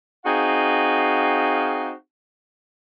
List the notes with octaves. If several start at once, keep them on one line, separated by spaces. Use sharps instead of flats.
C4 D#4 F#4 G#4 F5